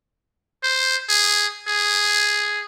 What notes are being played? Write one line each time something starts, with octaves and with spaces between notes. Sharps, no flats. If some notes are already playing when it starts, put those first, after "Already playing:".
C5
G#4
G#4